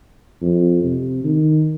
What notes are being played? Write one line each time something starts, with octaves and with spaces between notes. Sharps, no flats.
F2
C3
D#3